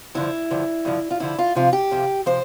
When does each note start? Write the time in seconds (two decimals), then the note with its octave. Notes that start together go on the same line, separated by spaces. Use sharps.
0.15 G2 D3 F3 E4
0.51 G2 D3 F3
0.85 G2 D3 F3
1.11 F4
1.20 G2 D3 F3 E4
1.39 F4
1.55 F2 C3 F3 F4
1.73 G4
1.91 F2 C3 F3
2.26 C3 F3 C5